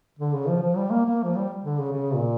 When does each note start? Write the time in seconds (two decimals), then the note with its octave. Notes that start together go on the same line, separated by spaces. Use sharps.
0.19 D3
0.34 C#3
0.48 F3
0.62 F3
0.77 G3
0.91 A#3
1.06 A#3
1.24 F3
1.35 G3
1.64 D3
1.79 C#3
1.93 C#3
2.15 A#2